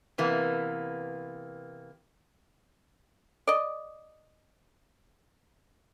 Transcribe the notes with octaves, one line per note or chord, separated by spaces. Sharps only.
C3 E3 A#3 B3
D5 D#5